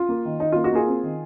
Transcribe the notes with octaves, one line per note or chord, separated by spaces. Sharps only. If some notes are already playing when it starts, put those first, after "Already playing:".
Already playing: F4
A#3
D#3
D#3 D#4
A#3 F4
D#4 F#4
A#3 F4 G#4
C4
D#3